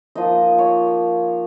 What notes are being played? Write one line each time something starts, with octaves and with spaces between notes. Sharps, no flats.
F3 A#3 D#4 D#5
C#5